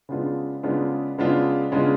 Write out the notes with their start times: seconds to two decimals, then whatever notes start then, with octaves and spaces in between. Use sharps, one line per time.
0.09 C#3 G#3 B3 D4 F4
0.63 C#3 G#3 B3 D4 F4
1.18 C#3 G#3 B3 D4 F4
1.72 C#3 G#3 B3 D4 F4